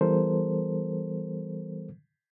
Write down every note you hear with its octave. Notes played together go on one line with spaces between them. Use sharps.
E3 G3 B3 A4 A#4 C5